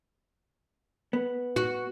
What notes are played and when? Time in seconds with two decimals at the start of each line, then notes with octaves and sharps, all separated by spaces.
1.13 B3
1.56 F#4